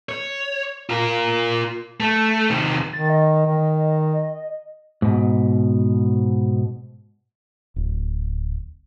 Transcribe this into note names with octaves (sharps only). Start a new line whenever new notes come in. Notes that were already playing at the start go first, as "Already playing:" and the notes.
C#5
F4 A#4
A3
C3 D#3
D#3 A6
D#5
D#3
G#2 B2
D1